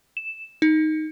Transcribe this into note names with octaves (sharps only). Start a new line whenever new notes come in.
E7
D#4